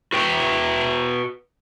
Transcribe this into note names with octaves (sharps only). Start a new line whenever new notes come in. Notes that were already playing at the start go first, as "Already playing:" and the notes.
F#4 B4 G5